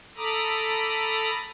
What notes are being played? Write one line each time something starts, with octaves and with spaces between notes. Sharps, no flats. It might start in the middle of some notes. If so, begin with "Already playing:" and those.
A4 A#5 B5 D6 D#6